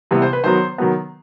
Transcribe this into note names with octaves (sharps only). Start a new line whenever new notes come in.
C3 E3 G3 B3
C5
B4
D#3 F#3 B3 C5
D#3 F#3 B3